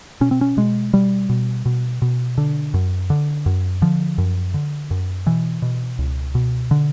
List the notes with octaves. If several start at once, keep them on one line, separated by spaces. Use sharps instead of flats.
B2 C#4
C4
C#4
B2 G#3
B2 G3
B2
B2
B2
D3
F#2
D3
F#2
D3 F3
F#2
D3
F#2
B2 E3
B2
C#2
B2
D3